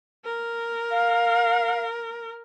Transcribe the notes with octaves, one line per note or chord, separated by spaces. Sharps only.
A#4
F5